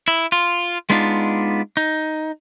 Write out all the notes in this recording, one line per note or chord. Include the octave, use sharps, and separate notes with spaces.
E4
F4
G#3 B3 D4 D#4 F4
D#4